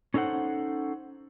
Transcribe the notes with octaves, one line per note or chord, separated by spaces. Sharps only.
C#4 D#4 A4 C5 F#5